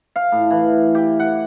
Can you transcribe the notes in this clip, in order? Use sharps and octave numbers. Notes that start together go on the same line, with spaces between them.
F5
A2
E3
G4
F#5